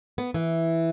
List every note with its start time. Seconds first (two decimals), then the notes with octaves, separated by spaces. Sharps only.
0.18 B3
0.34 E3